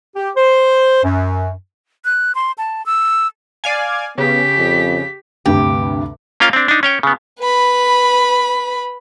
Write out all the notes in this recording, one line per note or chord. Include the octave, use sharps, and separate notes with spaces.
G4
C5
F#2
F#6
C6
A5
E6
D5 F5 G#5
C#3 B3 G4 B6
F2
D2 G2 C3 G4
A#3 C#4 F4 F5 G5
C4 D4
D4 D#4
C#4 C#5 G5
C#3 B3
B4 B5